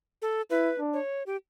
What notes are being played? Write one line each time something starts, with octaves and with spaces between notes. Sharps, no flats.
A4
E4 B4
D4
C#5
G4